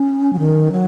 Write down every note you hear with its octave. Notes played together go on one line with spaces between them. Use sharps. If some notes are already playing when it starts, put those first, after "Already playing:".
Already playing: C#4
F#3
D#3
F#3